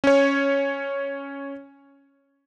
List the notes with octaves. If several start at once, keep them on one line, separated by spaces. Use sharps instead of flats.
C#4 C#5